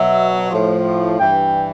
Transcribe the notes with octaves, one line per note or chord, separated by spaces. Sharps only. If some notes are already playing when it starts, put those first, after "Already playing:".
Already playing: B2 F#3 E5
A2 F3
G2 E3 G5